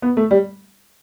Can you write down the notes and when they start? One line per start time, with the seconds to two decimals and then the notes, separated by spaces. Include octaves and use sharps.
0.02 B3
0.17 A3
0.31 G3